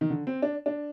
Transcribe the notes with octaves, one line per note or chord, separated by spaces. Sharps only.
D#3
D3
C4
D4
D4